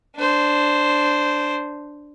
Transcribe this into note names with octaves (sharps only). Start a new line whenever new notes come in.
D4 C5